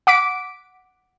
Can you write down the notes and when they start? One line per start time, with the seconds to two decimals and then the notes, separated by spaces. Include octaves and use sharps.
0.07 F#5 D6 B6 D7